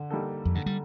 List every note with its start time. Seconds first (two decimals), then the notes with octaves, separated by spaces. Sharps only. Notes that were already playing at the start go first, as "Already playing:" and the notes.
Already playing: D3
0.10 G3 A#3 D#4 A4
0.45 F2
0.55 G2 D3
0.66 G3